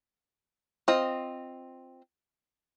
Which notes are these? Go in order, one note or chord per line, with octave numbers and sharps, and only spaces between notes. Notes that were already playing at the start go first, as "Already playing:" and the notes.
C4 F4 D#5